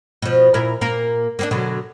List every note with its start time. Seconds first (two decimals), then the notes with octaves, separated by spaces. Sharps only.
0.22 B2 F3
0.54 A#2 E4 A#4
0.81 A#2 A#3 A#4
1.39 A#3 B3 D4
1.51 B2 D3 F#3